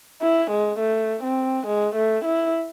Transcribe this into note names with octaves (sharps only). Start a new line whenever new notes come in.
E4
G#3
A3
C4
G#3
A3
E4